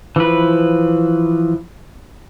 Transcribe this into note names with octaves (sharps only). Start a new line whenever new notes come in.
E3 F3 B4